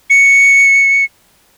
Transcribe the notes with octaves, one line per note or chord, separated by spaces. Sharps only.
C#7